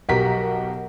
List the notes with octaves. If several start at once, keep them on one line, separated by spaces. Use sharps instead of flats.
B1 F#4 G4 A#4 B6